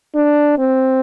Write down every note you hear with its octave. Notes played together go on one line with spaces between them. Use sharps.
D4
C4